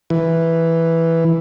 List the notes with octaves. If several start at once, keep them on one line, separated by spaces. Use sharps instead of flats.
E3